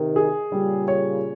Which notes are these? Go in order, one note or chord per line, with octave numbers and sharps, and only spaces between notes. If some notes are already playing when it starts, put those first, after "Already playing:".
Already playing: C3 D#3
G#4
A#2 C#3 G3
C#5